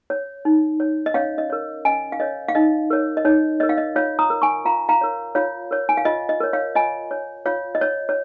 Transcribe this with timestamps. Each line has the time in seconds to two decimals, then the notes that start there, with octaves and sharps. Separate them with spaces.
0.10 C#5
0.45 D#4
0.80 C#5
1.06 D#5
1.14 C#4 C#5 F5
1.38 D#5
1.50 A#4 C#5
1.85 C#4 D#5 G#5
2.12 F5
2.20 A#4 C#5 D#5
2.49 F5
2.55 D#4 D#5
2.90 A#4 C#5
3.17 D#5
3.25 D#4 C#5
3.60 A#4 C#5 D#5
3.69 F5
3.78 D#5
3.95 F4 C#5 F5
4.19 A#5 D#6
4.30 A#4 C#5
4.42 G#5 C#6
4.65 F4 F5 A#5
4.89 F5 A#5
5.01 A#4 C#5
5.35 F4 C#5 F5
5.71 A#4 C#5
5.89 G#5
5.97 F5
6.05 F4 D#5
6.29 D#5
6.40 A#4 C#5
6.53 C#5 F5
6.75 F4 D#5 G#5
7.11 C#5
7.46 F4 C#5 F5
7.75 D#5
7.81 C#5
8.09 C#5